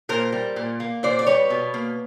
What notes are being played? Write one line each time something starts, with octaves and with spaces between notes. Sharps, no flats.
A#2 A#4 C5
G3
A#2
A#3
A#2 C5 D5
D5
G3 B4 C#5
B2
A#3